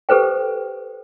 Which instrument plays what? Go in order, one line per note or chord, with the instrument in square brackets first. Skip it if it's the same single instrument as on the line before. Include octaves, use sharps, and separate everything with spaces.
[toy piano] G4 A4 B4 C5 G5